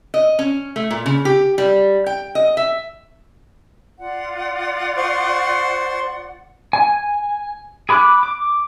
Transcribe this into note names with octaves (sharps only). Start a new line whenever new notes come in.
D#5
C#4
A3
A#2
C#3
G4
G3
G5
D#5
E5
F4 D5 F#5
C5 C6 C#6
G#5
G#4 B5 D6 F#6
D6